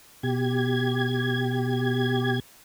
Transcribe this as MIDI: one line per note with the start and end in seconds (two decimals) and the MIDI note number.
0.23 2.40 47
0.23 2.40 67
0.23 2.40 92